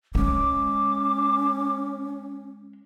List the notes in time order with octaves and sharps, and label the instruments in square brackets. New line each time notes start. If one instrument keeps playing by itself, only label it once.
[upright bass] G#3 [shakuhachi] C#4 [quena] D6